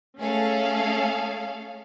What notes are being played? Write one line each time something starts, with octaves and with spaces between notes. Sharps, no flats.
A3 C#4 G#4 A4 F5